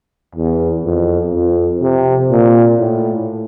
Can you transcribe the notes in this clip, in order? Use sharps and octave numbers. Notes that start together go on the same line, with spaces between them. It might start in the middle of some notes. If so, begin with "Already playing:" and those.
E2
F2
F2
C3
A#2
A2